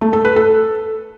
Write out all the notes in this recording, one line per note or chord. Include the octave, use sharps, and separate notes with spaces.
A3
A4
B4
A4